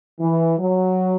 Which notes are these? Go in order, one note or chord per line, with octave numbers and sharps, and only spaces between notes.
E3
F#3